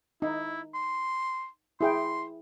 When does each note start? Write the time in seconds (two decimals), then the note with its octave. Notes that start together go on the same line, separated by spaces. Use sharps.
0.22 D#4 E4
0.74 C6
1.81 E4 G#4 G5 C6